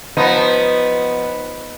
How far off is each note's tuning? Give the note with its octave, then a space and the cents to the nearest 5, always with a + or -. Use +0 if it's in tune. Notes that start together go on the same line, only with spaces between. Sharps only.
F3 +15 B3 +0 D#4 +0